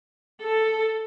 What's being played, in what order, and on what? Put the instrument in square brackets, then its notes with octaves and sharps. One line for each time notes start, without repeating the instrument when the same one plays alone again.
[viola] A4